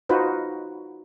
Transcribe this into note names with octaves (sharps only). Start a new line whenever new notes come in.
D#4 F4 F#4 B4 C5